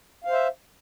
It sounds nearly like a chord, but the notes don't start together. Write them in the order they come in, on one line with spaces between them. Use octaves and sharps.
F5 C5 E5